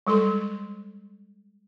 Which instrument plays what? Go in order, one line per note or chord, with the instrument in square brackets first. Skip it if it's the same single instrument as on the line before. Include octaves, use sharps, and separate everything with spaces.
[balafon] G3 G#3 A4 C6